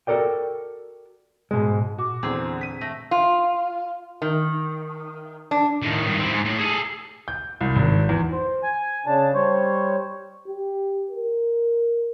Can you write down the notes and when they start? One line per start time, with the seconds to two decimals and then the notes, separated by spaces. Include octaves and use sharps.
0.07 F#4 A4 A#4 D5 G5
1.51 G#2 B2 G#3
1.98 A#2 F#4 D6
2.23 E2 D3 C4 G#4
2.61 B6 D#7
2.81 A3 A#6
3.11 F4
4.22 D#3
5.51 D4
5.82 A2 D#3
6.06 G2 D#3
6.19 C4 E4
6.32 G#2
6.45 A2 A3
6.59 G#4 A4
7.28 G6
7.61 C2
7.76 G#1
8.09 E2
8.32 C5
8.63 G#5
9.06 C#3 D4 A5
9.34 G3 C5 C#5
10.47 G4
11.10 A#4